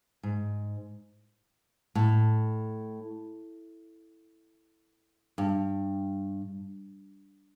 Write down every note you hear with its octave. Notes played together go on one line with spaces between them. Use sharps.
G#2
A2
G2